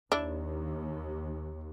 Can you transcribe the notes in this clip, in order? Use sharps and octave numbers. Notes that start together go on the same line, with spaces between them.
D#2 D4 E4